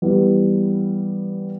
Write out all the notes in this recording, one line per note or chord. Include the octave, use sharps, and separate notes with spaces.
E3 G3 B3